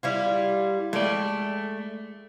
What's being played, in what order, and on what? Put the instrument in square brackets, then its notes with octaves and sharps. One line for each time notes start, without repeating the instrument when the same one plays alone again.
[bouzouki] G3 E4 F4
[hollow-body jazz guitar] G#3 D5 [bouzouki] A3